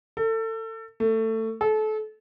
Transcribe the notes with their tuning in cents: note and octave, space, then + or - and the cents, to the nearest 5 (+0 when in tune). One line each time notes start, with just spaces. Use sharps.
A4 +30
A3 +20
A4 -30